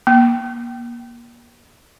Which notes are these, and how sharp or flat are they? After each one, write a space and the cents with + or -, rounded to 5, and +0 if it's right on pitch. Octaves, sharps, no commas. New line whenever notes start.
A#3 +30